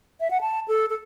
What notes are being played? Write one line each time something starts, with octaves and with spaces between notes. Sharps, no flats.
E5
F#5
A5
A4
A4